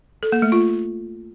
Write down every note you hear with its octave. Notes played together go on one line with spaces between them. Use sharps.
A4
A#3
A3
F4